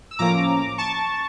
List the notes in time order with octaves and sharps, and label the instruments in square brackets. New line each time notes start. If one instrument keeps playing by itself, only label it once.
[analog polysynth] E6
A2 F3 A#3 C#4 A#5 D6
A5 C#6